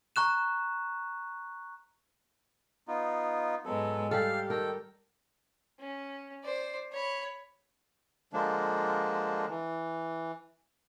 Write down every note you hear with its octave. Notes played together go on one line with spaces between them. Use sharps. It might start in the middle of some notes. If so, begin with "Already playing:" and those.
A#5 C#6 F#6 E7
B3 D#4 F4
G#2 F#3 G#3 B3 A4
G3 G4 A4 F5 F6
D#3 A4 A#4 G5
C#4
C5 D5
C#5 B5
D3 F3 G#3 A#3 D4
E3